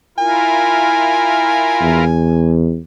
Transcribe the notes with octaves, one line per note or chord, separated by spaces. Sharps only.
E4 F4 A#4 G#5
E2